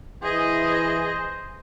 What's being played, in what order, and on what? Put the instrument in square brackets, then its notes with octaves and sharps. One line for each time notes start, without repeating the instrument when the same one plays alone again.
[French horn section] E3 [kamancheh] G#4 D#5 [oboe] C5